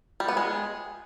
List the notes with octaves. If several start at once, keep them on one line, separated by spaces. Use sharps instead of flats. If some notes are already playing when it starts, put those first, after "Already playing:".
G3
B3
G#3